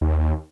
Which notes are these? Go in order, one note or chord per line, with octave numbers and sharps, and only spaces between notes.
D#2